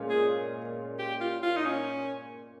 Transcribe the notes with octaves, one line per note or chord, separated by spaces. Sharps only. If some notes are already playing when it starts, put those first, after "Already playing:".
Already playing: A#2 G#3 C#4 F4
G#4
G4
F4
F4
D#4
C#4